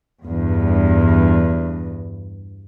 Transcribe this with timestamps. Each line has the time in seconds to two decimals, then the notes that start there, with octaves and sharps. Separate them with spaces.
0.24 E2 G2